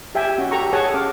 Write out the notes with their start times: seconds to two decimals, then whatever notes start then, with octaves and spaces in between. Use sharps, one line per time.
0.15 G4 E5 G5 G#5
0.38 C#4 F#4
0.51 G4 A4 A#5 C#6
0.73 G#4 A4 C#5 F#5 G#5 A5
0.94 C#4 F5 D6